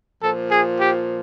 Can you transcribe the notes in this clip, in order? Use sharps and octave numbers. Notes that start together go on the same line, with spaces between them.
A#2 F3 A4
G#4
G4